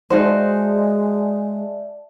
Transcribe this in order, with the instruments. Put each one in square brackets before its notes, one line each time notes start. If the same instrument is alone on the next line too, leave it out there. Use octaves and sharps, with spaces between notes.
[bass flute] G#3 [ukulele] D#4 F#4 C5 [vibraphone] D5 E5 A5